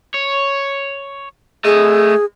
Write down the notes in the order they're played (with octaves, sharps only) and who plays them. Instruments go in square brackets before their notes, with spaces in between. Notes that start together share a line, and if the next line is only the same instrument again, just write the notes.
[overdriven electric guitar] C#5
[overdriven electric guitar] A3 D#5 [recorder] G#4